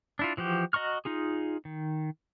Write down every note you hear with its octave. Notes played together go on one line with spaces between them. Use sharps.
D4 E4 F4
E3 F3 F#4 G4
F#4 D#5 A#5 C#6 F6
D#4 F4 G#4
D#3